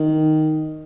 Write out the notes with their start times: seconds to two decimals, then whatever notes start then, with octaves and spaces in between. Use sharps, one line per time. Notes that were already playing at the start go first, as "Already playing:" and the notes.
Already playing: D#3